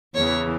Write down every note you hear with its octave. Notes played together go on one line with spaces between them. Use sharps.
E2 C#3 E3 C#5